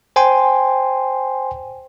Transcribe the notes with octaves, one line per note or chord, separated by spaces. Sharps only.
C5 G5 G#5 C6